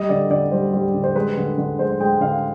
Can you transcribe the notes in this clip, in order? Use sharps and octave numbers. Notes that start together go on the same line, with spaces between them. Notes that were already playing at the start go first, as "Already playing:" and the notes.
Already playing: G3 D#5
D3 D5
D3 D5
G3 C5
G3
D3
C5
G#3 B4
D3
D3
G#3 C5
G#3 G5
D3 F5